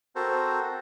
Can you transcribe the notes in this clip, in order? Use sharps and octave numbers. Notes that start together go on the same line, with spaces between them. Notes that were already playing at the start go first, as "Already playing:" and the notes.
C4 F#4 A4 A#4 C5